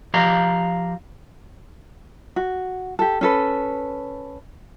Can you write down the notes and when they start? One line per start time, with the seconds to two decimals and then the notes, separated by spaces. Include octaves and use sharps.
0.14 F3 G4 F5 A#5
2.36 F#4
2.99 G4 A4
3.21 C#4 A4 B4